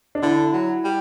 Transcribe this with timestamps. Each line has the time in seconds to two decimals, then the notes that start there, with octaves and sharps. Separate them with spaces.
0.15 D4
0.22 D3 E4
0.53 F#3
0.84 G3